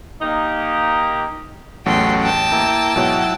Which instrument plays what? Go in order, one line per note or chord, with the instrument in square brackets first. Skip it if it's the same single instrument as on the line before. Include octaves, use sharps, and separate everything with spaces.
[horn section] A#3 D#4 G4
[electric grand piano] A1 E2 [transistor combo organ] F#3 A3 C#4 [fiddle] G5 C6
[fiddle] G5 A5
[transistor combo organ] A#3 E4
[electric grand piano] G#2 B2 C#5 [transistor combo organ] F#3 E4